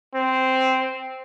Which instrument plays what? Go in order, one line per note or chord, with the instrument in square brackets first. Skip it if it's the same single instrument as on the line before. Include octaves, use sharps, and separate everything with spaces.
[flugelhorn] C4